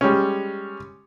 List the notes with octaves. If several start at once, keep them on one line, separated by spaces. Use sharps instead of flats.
G3 G#3 C#4